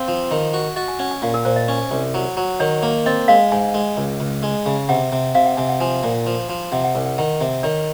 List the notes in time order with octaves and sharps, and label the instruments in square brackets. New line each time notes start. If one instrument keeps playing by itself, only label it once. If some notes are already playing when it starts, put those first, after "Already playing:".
Already playing: [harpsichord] C4 [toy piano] F5
[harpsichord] F3
D#3
F#4
[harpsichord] F#4 [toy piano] D#5
[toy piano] G#5
[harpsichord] C#4 [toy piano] F#5
[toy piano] G#5
[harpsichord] A#2 [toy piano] F5
[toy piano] A#4
[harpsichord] A#2 [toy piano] C5
[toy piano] D#5
[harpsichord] C#4
C2
F#3
F#3
[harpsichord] D#3 [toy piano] C#5
[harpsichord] A#3
[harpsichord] C4 [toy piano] D#5
[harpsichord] G#3 [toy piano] F5
[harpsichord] G#2 [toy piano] G#5
[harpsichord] G#3
C#2
C#2
G#3
C#3
[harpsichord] C3 [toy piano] F#5
[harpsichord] C3
[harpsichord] C3 [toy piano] F5
[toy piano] F#5
[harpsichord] C3 [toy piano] G#5
[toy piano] F#5
[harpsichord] F3 [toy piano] G#5
[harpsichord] A#2
F3
F3
[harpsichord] C3 [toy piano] F#5
[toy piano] F#5
[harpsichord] C2 [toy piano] G#5
[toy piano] F#5
[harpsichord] D#3 [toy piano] F#5
[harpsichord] C3
[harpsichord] D#3 [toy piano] C#5